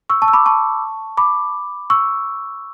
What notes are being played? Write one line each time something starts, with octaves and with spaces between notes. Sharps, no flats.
C#6 E6
A5 C#6
E6
B5 D6
A5 C#6
B5 D6
C#6 E6